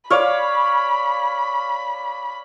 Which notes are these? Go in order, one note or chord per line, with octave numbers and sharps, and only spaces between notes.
C#5 D5 F5 B5